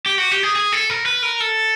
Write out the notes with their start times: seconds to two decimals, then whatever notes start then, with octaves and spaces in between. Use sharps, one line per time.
0.06 G4
0.18 F#4
0.31 G4
0.43 G#4
0.56 G#4
0.72 A4
0.90 A#4
1.06 B4
1.23 A#4
1.40 A4